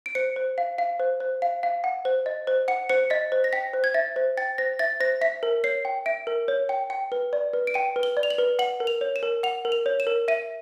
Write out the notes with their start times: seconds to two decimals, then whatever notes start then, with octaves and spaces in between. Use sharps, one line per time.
0.06 D7
0.15 C5 C#7
0.36 C5
0.58 F5
0.78 F5
1.00 C5
1.20 C5
1.42 F5
1.63 F5
1.84 F#5
2.05 C5
2.26 D#5
2.47 C5
2.68 F#5 C#7
2.89 C5 C#7
3.10 D#5 B6
3.32 C5
3.44 A#6
3.53 G5 B6
3.74 C5
3.84 G#6
3.94 E5 A6
4.16 C5
4.37 G5 A6
4.58 C5 A#6
4.79 E5 A6
5.00 C5 A#6
5.21 E5 B6
5.43 A#4
5.64 C#5 C7
5.85 G5
6.06 E5 D7
6.27 A#4
6.48 C#5
6.69 G5
6.90 G5
7.12 B4
7.33 D5
7.54 B4
7.67 D7
7.74 G5 D#7
7.96 B4
8.03 G7
8.17 D5
8.23 F7
8.31 F#7
8.38 B4
8.59 F#5 F#7
8.80 A#4
8.87 F7
9.01 C#5
9.16 E7
9.23 A#4
9.43 F#5 F7
9.65 A#4
9.72 F7
9.86 C#5
10.00 E7
10.07 A#4
10.28 E5 D#7